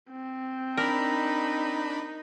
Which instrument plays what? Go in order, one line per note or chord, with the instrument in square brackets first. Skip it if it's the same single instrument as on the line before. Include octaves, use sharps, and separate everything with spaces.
[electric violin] C4
[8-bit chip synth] D4 B5 [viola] D#4 [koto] A#4